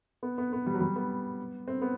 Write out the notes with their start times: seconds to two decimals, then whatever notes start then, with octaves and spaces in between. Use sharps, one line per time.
0.23 B3
0.38 B3
0.53 B3
0.66 G3
0.74 F#3
0.81 G3
0.96 B3
1.68 C4
1.82 B3